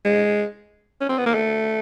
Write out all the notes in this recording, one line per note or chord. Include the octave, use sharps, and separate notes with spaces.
G#3
C#4
C4
B3
A#3
A3